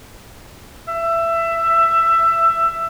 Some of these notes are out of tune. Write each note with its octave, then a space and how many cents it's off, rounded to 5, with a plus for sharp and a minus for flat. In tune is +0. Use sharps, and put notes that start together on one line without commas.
E5 +15